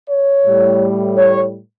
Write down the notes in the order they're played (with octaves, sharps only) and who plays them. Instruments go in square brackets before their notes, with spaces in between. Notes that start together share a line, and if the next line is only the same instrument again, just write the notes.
[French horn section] C#5
A2 G3
C#5